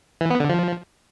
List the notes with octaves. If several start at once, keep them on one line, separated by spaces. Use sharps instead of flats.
E3
B3
D3
F3